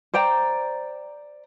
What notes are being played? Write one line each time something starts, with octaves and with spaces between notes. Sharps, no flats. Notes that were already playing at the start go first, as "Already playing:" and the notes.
C5 D5 G5 A#5